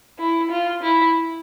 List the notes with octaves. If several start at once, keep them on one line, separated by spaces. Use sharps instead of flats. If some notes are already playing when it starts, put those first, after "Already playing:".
E4
F4
E4